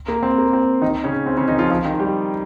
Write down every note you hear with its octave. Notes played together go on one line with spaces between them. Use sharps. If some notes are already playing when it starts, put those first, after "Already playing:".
A#3
C4
A#3
C4
D#3 D#4
C#3 C#4
C4
C#3 C#4
D#3 D#4
F3 F4
F3 F4
D#3 D#4
G3 G4